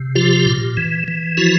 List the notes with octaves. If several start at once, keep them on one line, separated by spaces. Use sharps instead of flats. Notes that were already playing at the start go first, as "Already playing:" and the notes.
Already playing: C3
F3 F4 G4
A#2
E3
E3
F3 E4 F#4